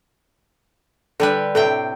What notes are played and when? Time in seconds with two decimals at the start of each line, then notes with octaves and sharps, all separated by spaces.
1.20 D3 G3 A4 B4
1.55 A2 C3 A4 G5